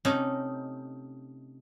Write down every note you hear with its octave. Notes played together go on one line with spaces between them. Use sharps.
C3 A3 C#4 D#4